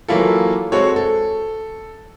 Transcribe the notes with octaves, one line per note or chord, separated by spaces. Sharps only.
E3 F#3 A#3 E4 F4 A4
G#3 C4 F#4 A4 C#5
A4